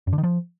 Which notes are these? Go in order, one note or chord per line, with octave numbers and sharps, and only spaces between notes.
F#2
D3
D#3
F3